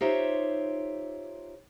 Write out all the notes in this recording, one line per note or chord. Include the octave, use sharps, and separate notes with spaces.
D#4 F4 G4 C5 C#5 E5